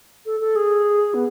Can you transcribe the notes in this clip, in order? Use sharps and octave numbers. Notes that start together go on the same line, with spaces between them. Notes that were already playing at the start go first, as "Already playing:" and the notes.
A4
A4
G#4
B3